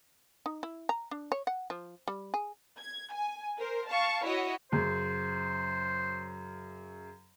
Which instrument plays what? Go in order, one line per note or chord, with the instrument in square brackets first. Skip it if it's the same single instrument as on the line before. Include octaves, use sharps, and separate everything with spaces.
[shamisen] D#4
E4
A#5
D4
C#5
F#5
F3
G3
G#4
[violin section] G#6
G#5
A#4 C5
F5 A5 C#6
E4 F#4 C#5 D#5
[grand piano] F#2 C#3 [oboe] C5